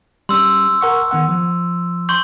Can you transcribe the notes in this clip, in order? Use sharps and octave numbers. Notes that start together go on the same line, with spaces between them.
G3 C#4 C6 E6
A#4 F#5 C#6
D#3 B3 F#5
F3
C6 C#6 G6